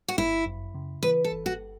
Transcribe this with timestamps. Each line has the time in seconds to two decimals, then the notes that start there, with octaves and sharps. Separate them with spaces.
0.08 F#4
0.17 G1 E4
0.46 F#2
0.75 C#3
1.03 E3 B4
1.24 A4
1.32 G1
1.46 F#4